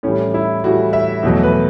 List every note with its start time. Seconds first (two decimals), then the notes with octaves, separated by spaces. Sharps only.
0.03 A2 E3 G3 C#4
0.34 E4
0.64 A2 E3 G3 F#4
0.93 E5
1.23 E2 B2 F#3 A3
1.43 B4